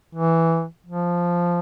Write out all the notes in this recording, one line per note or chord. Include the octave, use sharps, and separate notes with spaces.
E3
F3